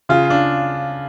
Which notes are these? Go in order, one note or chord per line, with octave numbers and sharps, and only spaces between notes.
C#3 F4
D4